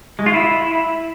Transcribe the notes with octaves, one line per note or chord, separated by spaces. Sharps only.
G#3
F4
E4